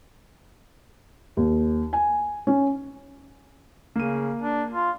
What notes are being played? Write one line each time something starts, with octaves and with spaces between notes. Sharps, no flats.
D#2
G#5
C#4
C#3 A#3 D#7
D4
F4